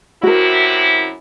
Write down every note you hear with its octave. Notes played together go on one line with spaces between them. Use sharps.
F#2 C3 E4 F#4 A#4